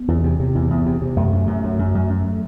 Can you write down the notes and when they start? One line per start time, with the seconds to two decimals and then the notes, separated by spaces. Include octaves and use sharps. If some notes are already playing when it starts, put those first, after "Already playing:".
Already playing: B3
0.08 E2
0.24 C3
0.40 C3
0.55 E2
0.70 E2
0.86 C3
1.02 C3
1.16 F#2 A3
1.33 F#2
1.47 F#2
1.64 F#2
1.79 F#2
1.95 F#2
2.10 F#2